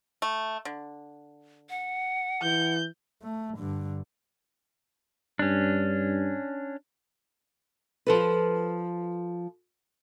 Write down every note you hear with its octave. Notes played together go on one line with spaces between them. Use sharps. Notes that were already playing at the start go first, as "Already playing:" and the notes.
A3
D3
F#5
E3 G6
A3
G2 D3
G2 C#4 D4
F3 A4 B4